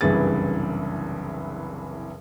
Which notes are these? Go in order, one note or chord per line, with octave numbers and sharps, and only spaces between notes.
F#1 C2 G2 E3 G#4 A6